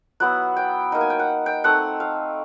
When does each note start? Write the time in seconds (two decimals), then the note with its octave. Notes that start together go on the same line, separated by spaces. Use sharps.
0.20 F#3 B3 E4 F#5
0.56 G5
0.92 A#3 D#4
1.01 G#5
1.10 G5
1.19 F#5
1.46 G5
1.64 A3 C4 D#4 F#5
2.00 F5